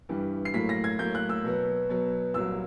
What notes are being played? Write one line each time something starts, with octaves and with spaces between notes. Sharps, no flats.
G2 E3 G3
C7
A2 F#3 A#3 B6
A#6
G#6
A2 F#3 A#3 G6
F#6
E6
B2 F#3 B3
B2 F#3 B3
C2 A#2 F#3 A#3 E6